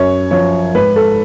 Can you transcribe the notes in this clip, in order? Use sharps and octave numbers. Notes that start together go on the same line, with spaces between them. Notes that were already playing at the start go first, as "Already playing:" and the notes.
Already playing: F#2 C#5
F3 C#5
G#2 B4
A4